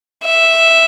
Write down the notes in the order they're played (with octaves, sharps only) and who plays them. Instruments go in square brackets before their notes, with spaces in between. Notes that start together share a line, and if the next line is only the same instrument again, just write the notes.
[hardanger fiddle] E5